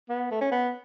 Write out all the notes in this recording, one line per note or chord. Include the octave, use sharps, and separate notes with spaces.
B3
A3
C#4
B3